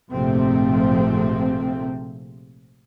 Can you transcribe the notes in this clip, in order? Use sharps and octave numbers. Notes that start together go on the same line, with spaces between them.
A#1 G#2 C3 F3 A3 C4